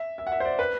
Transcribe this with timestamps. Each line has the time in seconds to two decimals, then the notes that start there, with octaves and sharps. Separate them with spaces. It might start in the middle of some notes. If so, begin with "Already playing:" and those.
Already playing: E5
0.18 E5
0.27 F#5
0.32 E5
0.40 C5
0.45 D5
0.59 B4